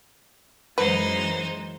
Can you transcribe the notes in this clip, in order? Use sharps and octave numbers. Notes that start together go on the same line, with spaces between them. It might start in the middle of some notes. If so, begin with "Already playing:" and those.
F#2 E3 G#3 D#4 B4 C5